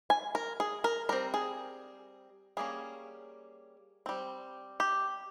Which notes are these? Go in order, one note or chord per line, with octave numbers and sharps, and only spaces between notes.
G#5
A#4
G#4
A#4
G3 C4 A#4
G#4
G3 A#3 C#4 G#4
G3 C4
G4